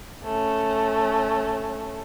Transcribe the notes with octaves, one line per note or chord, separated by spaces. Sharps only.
A3 C#4